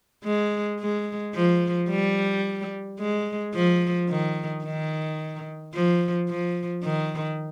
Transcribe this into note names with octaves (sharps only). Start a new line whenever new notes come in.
G#3
G#3
F3
G3
G#3
F3
D#3
D#3
F3
F3
D#3